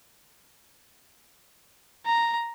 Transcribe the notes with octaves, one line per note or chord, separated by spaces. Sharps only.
A#5